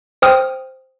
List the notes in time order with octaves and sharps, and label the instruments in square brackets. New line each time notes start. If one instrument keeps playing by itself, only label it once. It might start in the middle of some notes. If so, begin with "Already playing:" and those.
[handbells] C5 G5 D#6 F6